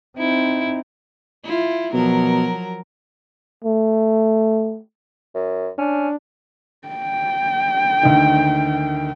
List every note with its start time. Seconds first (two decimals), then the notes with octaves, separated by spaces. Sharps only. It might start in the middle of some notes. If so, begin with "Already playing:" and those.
0.18 C4 D#4 E4
1.44 E4 F4
1.93 B2 F3 F#3 A#4
3.65 A3
5.35 F#2
5.78 C#4 D4
6.88 G5
8.03 D2 D#3